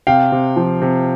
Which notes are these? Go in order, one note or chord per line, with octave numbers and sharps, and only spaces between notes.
C3 F5 G5
C3
F3
C3